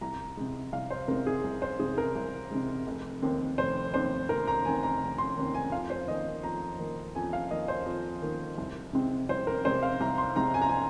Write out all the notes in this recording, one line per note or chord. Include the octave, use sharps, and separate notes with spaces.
C2 A#5
C3 G#3
C2 F5
C5
C3 G#3 A#4
G#4
C2
C5
C3 G#3 G#4
A#4
C2
C3 G#3
F1
D#2 D#3 C4
F1 C5
D#2 D#3 C4 C5
F1 A#4
A#5
D#2 D#3 C4 G#5
A#5
F1
C6
D#2 D#3 C4
G#5
F2 F5
C5
D#3 A#3 D#5
F2 A#5
D#3 A#3
F2 G#5
F5
D#3 A#3 D#5
C5
F2
D#3 A#3
C2
C3 G#3 C4
C2 C5
A#4
C3 G#3 C4 C5
F5
C2 A#5
C6
C3 G#3 C4 A#5
G#5
A#5
G#5